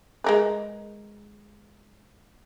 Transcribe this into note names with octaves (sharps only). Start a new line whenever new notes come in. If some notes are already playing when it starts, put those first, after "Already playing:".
G#3 A#4 B4